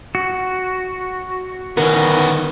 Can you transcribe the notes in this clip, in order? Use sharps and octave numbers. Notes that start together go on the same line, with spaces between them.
F#4
D3 D#3 B3 C#4 E4 A#4